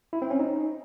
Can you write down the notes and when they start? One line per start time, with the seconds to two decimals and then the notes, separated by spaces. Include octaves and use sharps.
0.13 E4
0.22 C4
0.31 C#4
0.39 D#4